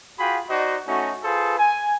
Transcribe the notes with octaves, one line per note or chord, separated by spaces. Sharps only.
F4 F#4 G#4 G5 B5
D#4 F#4 C5 D5 D#5
A3 C#4 D#4 F#4
F4 G#4 A4 B4 C5
G#5